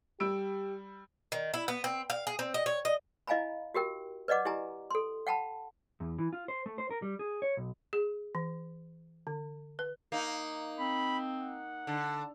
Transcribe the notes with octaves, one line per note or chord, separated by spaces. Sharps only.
G3 G4 E6 D7
D#3
E4
B3
C4
F5
G#4
C4
D#5
C#5
D#5
E4 D#5 F5 G#5 A#5 B5
F#4 G4 A#4 G5
B4 D5 D#5 F#5 D6
E4 G4 G#5 A#5
A4 C6
F#5 G5 A5 B5
E2
E3
F4
C5
A3
C5
A#4
G3
G#4
C#5
B1
G#4
E3
D3
B4
A#3 D#4
C4 B5
F#5
D3 A5